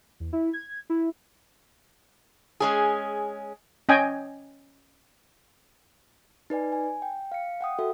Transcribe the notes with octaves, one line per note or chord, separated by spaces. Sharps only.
E2
E4
G#6
E4
G#3 C#4 G#4
C#4 D#5 G5 G#5
D#4 B4 D5 G#5
G#5
G5
F5 C#7
F#5 G5 D#6
F#4 A4 E5